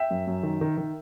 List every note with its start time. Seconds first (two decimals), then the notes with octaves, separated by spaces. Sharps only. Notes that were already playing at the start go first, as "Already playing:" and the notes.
Already playing: E5 G5
0.11 F#2
0.27 F#2
0.43 D#3
0.61 D#3
0.78 D#3